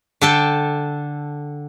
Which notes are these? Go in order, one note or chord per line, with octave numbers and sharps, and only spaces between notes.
D3 A4 G5